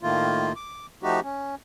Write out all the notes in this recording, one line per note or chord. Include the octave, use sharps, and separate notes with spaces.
A2 D#3 A3 A#3 F4
D6
F3 A3 D#4 F#4 G4
C#4